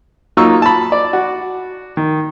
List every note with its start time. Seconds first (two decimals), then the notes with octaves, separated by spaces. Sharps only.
0.37 F#3 A#3 D#4 F4 C#6 E6
0.62 A5 B5
0.92 D5
1.13 F#4
1.97 D#3